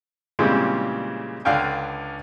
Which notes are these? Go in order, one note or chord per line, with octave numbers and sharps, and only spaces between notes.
A#2 C#3 E3 G3 G#3 C4
C#2 D3 D4 F5 G5 G#5